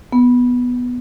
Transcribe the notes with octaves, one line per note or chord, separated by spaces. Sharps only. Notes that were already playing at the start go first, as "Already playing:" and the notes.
B3